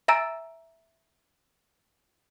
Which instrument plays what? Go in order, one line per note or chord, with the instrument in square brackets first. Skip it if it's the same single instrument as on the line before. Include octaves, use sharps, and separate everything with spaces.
[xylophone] E5 G#5 A#5 E6 A6 D7